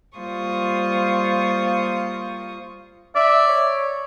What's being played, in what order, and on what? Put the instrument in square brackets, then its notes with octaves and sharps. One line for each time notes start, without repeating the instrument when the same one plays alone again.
[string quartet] G3 A#3 F4 C5 C#6 D#6
[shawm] D5 [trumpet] E5
[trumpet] C#5